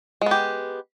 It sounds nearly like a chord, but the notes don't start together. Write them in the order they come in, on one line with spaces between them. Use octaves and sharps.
G#3 B3 G4